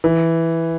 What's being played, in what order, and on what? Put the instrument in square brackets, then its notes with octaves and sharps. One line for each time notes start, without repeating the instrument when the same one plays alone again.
[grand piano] E3